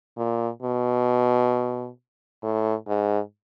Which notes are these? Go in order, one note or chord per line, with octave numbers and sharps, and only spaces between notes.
A#2
B2
A2
G#2